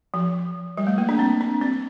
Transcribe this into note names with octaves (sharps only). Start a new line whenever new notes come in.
F3
G3
A3
A#3
D4
C4
D4
C4